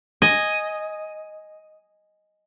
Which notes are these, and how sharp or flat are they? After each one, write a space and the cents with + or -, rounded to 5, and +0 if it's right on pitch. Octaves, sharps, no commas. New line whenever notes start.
D#5 +0 G#5 +0